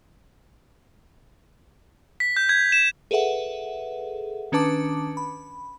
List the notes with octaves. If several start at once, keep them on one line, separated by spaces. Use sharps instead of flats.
B6
G6
G#6
E7
G#4 A4 B4 E5 F#5
D#3 C#4 D4 B4 A5 D6
B5